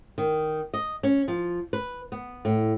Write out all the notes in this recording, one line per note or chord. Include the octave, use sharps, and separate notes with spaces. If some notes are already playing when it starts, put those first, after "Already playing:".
D#3
D#5
C#4
F3
B4
B3
A2